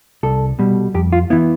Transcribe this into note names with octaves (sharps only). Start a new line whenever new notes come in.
C2 A4
B2 G3
F2 G4
F4
E3 B3 E4